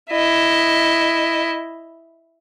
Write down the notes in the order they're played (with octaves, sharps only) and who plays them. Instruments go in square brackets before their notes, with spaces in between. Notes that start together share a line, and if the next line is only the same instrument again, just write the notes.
[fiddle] E4 D#5